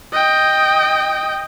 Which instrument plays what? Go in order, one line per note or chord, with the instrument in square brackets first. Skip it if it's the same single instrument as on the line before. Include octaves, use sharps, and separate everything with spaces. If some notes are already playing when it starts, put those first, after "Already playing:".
[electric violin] D#5 G5